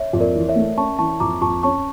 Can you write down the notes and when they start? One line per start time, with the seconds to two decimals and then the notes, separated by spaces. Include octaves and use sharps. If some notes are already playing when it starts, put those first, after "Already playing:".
Already playing: C#5 E5
0.13 F2
0.20 A#4 D5
0.35 E3
0.49 C#5 E5
0.56 A3
0.77 C#4 A5 C#6
0.99 E3 A5 C#6
1.20 F2 A#5 D6
1.41 F2 A5 C#6
1.63 C#4 A5 C#6